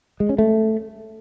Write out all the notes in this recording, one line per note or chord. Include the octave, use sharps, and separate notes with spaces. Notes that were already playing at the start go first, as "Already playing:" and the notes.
G#3
C#4
A3